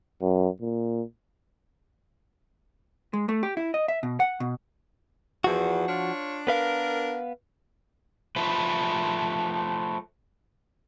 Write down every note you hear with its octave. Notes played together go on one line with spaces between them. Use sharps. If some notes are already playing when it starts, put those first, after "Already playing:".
F#2
A#2
G#3
A3
G4
E4
D#5
E5
B2
F#5
B2
E2 F3 F#4
D4 F4 C#5
B3 D4 A#4 B4 F5
F3 A3 B4